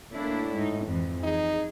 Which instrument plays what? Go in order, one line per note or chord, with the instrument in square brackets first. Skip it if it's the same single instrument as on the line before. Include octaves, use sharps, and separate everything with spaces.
[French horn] A2 [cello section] A#3 D4 E4
[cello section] G#2 D#4
F2 E3
[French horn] D#4 [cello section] G#4